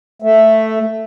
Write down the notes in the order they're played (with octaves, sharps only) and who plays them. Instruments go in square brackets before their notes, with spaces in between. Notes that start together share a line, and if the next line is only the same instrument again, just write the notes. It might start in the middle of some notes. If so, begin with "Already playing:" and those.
[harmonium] A3